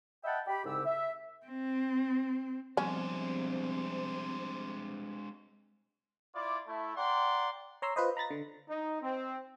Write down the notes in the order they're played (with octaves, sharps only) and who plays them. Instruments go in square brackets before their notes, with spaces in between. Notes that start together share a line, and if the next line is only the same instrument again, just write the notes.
[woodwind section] D#5 E5 F#5 G5 A5 B5
G4 B5
C2 G#2 C#3 G4 E6
E5
[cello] C4
[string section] C3 C5 [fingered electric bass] F3 G3 B3 [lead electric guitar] G#3 D4 [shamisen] C#4
[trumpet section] E4 F4 D5
A3 E4
D5 F#5 G5 A#5 C6
[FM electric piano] C#5 A#5 C6 E6
F4 B4 C5 D#5
A#5 B5 A6 A#6
D3
[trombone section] D#4
C4